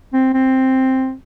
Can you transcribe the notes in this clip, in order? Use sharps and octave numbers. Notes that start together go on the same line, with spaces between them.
C4
C4